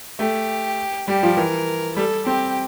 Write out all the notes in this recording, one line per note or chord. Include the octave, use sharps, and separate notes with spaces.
A3 G4
G3 G4
F3
E3 A#4
G3 A4
C4 G4